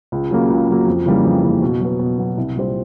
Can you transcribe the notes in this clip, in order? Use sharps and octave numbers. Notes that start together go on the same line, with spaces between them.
C#2
C#3 F#3 A#3
C#2
C#3 F#3 A#3
F2
C#3 E3 G3 A#3
F2
C#3 E3 G3 A#3
B2
F#3 B3
B2
F#3 B3
C2
A#2 G3 C4